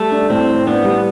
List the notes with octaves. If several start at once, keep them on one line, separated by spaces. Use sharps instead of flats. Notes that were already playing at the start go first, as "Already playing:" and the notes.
Already playing: G3 A3
D4
A2 C4
A2
B3 D4
G3